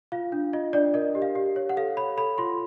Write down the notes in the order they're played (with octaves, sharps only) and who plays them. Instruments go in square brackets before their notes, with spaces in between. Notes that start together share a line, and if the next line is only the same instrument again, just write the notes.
[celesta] F4 F5
D4
F4 D#5
D4 D5
A#4 D#5
G4
F5
G4
C#5
F#5
A4 F5
C#5 B5
A4 B5
F4 C6